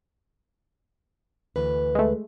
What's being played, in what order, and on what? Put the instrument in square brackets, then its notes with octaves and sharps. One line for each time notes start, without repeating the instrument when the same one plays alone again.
[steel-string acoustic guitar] D2 E3 B4
[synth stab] G#3 A3